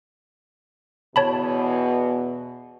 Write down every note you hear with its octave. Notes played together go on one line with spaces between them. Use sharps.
E2 B2 C#5 A5 B5